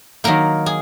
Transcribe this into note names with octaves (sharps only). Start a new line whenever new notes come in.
D#3 F#3 A#3 A#4
G#4